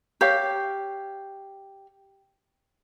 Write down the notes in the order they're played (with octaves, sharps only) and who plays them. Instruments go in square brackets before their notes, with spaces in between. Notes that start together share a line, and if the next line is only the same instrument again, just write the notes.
[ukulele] G4 C#5 F5